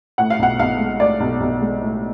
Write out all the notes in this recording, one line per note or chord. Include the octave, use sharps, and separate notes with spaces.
A2 F#5
F5
B1 F#5
B1 F5
G#3
A2 D5
B1
B1
G#3
A2